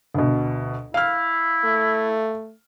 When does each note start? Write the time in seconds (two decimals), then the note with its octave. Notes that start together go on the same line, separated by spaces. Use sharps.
0.14 D2 B2
0.94 E4 F5 F6
1.64 A3